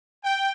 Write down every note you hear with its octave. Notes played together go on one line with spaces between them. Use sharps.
G5